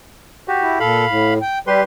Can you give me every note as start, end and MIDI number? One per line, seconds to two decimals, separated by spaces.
0.48 0.79 66
0.48 0.79 67
0.61 0.79 64
0.80 1.05 46
0.80 1.05 69
0.80 1.34 77
0.80 1.34 83
1.09 1.39 45
1.42 1.58 79
1.67 1.81 55
1.67 1.84 67
1.67 1.84 71
1.67 1.84 84